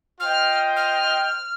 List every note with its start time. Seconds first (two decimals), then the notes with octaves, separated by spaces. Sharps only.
0.19 F4 C5 D#5 G5 F6
0.76 F6